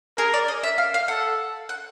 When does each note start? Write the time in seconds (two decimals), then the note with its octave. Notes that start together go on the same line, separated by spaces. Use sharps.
0.18 G#4 A#4
0.34 D5
0.48 D#5
0.63 E5
0.78 F5
0.94 F5
1.08 A4 F#5
1.69 F#5